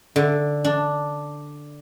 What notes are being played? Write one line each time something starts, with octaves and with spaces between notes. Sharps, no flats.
D3
D4